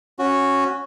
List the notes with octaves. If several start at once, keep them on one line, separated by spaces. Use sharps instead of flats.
C#4 F#4